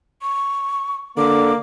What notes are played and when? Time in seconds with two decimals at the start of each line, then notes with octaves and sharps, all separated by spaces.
0.22 C#6
1.18 D3 A#3 D6